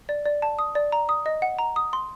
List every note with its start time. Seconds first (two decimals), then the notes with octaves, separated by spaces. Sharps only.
0.09 D5
0.26 D5
0.42 A5
0.59 D#6
0.75 D5
0.92 A#5
1.09 D#6
1.26 D#5
1.42 F#5
1.59 A#5
1.76 D#6
1.93 C6